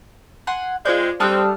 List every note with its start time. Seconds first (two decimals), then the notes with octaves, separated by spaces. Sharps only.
0.47 F#5 G#5 C6
0.85 G#3 C4 F4 C5 D5 G6
1.20 G3 A3 C4 D4 A5 D#6 F6 F#6